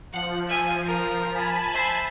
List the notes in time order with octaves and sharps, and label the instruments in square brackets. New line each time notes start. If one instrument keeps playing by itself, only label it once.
[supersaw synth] F3 [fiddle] F#5
[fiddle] E5 G#5
A#4
[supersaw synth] G#5 A5 B5
[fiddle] C5 E5